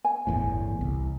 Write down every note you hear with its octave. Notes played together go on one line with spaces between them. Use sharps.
G#5
G1 E2 A2
C2